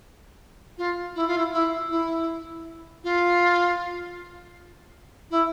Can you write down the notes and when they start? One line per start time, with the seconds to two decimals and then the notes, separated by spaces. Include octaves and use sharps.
0.78 F4
1.15 E4
1.27 F4
1.38 E4
1.53 E4
1.90 E4
3.04 F4
5.30 E4